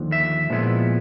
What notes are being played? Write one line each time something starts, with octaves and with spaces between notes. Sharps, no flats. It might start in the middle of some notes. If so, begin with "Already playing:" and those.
Already playing: D#2 D3 F3
E5
A#2 F3 G#3 B3 E4